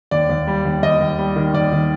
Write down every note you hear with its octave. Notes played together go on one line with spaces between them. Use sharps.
D#2 D5
D#2
G3
D#2
D#2 D#5
D#2
G3
D#3
D#2 D5
D#3